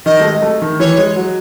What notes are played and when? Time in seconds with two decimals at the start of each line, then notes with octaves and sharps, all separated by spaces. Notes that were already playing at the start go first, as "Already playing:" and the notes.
0.06 D#3 D#5
0.20 A3
0.24 G#3
0.42 A3
0.62 D#3
0.80 E3 C#5
0.98 G#3
1.16 F#3